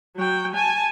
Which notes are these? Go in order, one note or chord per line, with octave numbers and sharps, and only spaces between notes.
F#3 G5
G#5 A5